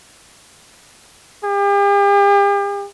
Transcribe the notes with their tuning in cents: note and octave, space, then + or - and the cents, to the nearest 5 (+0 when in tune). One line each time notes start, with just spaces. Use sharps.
G4 +45